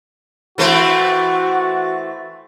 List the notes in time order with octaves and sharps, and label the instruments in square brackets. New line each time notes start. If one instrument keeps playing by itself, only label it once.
[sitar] E3 A3 C4 [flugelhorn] F#4